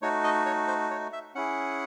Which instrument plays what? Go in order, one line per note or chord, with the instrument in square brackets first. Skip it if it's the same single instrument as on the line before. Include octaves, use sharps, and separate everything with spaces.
[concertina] A3 D#4 F#4 C#5
D#5
C#5
C5
C#5
E5
C#4 E4 G#4 F#5